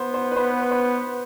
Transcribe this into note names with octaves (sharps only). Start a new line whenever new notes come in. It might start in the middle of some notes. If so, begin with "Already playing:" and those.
Already playing: B3 C5
C5
B4
B3 C5
C5